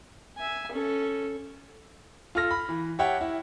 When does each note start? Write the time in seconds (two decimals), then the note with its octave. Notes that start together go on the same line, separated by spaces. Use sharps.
0.38 E5 G#5
0.72 C#4 A4
2.35 F4 A4 F6 A#6
2.51 B5
2.69 E3
2.99 G4 C#5 E5 F#5 G5 A5
3.21 E4